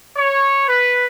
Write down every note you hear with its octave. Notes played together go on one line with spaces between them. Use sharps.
C#5
B4